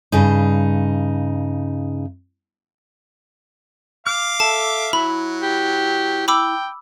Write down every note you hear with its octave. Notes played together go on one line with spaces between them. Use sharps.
G2 C#3 D#4
F5 D6 F6
A4 E5 A5
F#3 E4 B5
G4
G5 B5 D6 E6